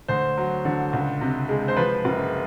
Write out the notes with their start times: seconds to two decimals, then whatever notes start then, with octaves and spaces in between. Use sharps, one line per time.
0.08 D2 C5
0.37 F#3
0.65 D3
0.93 C#2
1.21 C3
1.49 G#3
1.68 C5
1.76 F3 B4
2.05 F#1